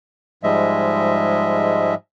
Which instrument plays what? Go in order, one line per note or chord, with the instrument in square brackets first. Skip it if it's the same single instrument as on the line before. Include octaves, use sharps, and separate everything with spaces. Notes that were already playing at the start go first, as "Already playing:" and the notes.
[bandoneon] G#2 F3 G3 G#3 D#5 E5